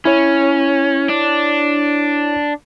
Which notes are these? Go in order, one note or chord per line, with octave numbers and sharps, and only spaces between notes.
C#4 E4 C#5
D4